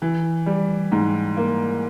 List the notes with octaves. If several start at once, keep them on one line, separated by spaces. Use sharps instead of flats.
E3
G3
G#2
A#3